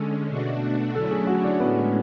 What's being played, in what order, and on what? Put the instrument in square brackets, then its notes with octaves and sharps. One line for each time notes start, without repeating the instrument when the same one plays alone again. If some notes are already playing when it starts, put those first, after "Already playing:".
Already playing: [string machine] D3 G#3 C#4 [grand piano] A4
[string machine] B2 A3 D4 F#4
[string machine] D3 F#3 A3 C#4 E4 [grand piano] A4
[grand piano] G#4
F#4
D4
[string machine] A2 G#3 C#4 [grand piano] B3